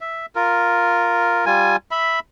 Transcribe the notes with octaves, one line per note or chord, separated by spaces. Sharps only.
E5
F4 A#4
G3 F4 G#5
E5 B5